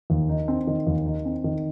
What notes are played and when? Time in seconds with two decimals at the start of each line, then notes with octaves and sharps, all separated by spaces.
0.10 D#2
0.29 D#4
0.48 C4
0.67 D#3
0.87 D#2
1.06 D#4
1.25 C4
1.44 D#3